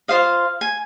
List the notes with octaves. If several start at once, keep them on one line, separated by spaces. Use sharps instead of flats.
F4 C5 D#5 F5
G#5